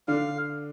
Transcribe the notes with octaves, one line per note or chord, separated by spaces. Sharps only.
D3 D4 F5